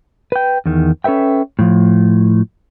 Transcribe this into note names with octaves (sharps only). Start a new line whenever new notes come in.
B4 G5
E2 D#3
C#4 A4 B4 E5 G5
A2 F3